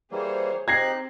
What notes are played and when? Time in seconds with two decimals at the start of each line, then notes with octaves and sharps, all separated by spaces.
0.12 E3 G3 A#3 G#4 C5 C#5
0.68 C4 D#4 G4 F#6 G#6 A#6 C7